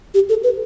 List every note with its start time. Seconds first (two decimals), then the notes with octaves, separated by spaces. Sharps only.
0.14 G4
0.29 A4
0.44 B4